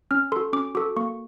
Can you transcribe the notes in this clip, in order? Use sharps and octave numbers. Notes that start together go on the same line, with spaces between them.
C#4 F6
F#4 A4 C6
C#4 D6
F#4 A4 D6
A#3 C#6